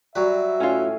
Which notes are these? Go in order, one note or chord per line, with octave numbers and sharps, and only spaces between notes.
F#3 G3 F#4 B4 E5 A#5
A2 C#4 F4 G#5 C#6